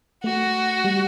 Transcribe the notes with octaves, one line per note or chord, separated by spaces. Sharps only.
A3 F#4
G3